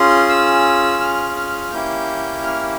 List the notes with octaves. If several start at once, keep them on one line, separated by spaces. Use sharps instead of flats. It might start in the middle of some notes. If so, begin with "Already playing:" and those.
Already playing: C#4 F4 G#4 C6
E6
F6
F6
A#3 C#4 E4 G4 G6
F6